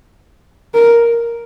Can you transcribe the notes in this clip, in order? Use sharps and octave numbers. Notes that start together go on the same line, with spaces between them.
A#4